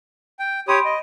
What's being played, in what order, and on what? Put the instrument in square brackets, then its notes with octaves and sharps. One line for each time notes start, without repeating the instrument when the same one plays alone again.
[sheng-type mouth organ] G5
[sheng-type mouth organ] G4 C#5 D#6 [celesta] B5 C6 D7
[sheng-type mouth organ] D#5